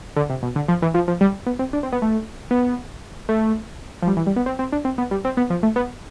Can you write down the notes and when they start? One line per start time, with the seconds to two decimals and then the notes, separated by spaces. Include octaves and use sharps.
0.16 D3
0.30 C3
0.43 B2
0.56 D3
0.68 F3
0.82 E3
0.94 F3
1.08 F3
1.21 G3
1.46 B3
1.59 C4
1.73 D4
1.83 C4
1.92 B3
2.02 A3
2.51 B3
3.29 A3
4.02 F3
4.07 G3
4.17 E3
4.27 G3
4.36 B3
4.46 C4
4.59 C4
4.72 D4
4.85 C4
4.98 B3
5.11 G3
5.25 C4
5.37 B3
5.50 F3
5.63 A3
5.76 B3